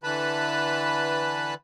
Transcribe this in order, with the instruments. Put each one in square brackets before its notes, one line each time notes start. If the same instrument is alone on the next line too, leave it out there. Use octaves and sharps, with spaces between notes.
[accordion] D3 E3 B4 A5 B5